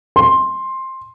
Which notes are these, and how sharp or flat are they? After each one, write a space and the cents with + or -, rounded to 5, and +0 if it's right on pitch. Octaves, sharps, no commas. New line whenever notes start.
C6 +10